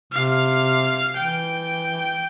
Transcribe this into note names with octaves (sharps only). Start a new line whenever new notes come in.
C3 F5
E3 G5